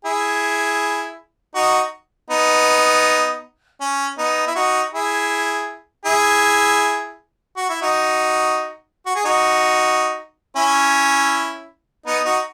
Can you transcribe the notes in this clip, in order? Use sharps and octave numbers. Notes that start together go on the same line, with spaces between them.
E4 G#4
D#4 F#4
B3 D#4
C#4
B3 D#4
E4
D#4 F#4
E4 G#4
E4 G#4
F#4
E4
D#4 F#4
F#4
G#4
D#4 F#4
C#4 E4
B3 D#4
D#4 F#4